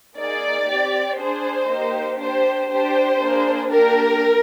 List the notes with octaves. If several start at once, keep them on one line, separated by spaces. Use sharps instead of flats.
A#3 D#4 G#4 D5
C4 G4
D4 G#4 C5
A#3 D#4 G4
D4 G4 C5
D4 G4 C5
A#3 D4 G#4
A#3 D4 G4 A#4